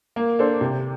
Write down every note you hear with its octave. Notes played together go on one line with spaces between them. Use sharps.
A#3
D4 A4 C5
C3